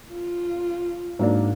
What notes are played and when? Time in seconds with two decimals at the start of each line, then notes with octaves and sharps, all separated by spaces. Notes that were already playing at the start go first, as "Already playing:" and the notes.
0.11 F4
1.19 G#2 F#3 A#3 D4